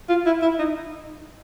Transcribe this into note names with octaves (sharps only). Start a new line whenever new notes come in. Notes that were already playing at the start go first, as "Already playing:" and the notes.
F4
E4
E4
D#4